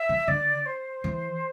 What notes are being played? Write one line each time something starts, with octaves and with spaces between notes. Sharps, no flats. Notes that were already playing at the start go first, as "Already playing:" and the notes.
Already playing: E5
E3
D3 D5
C5
E3